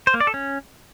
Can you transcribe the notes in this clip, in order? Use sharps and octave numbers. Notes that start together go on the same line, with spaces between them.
C5
A#3
D5
A4
C#4